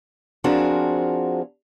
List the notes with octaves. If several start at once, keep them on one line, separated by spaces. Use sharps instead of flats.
F3 C4 D4 F#4 G#4 A#4